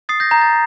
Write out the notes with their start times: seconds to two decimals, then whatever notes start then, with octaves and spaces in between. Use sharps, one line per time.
0.09 D#6 A6 C7
0.20 G6 A#6
0.31 A#5 G6
0.42 A6